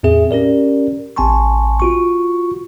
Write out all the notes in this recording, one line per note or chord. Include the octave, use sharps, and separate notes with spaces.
E2 A2 C4 G#4 E5
C#4 G4 A#4 D5
A1 C4 G#5 A5 C6 C#6
F4 F#4 C#6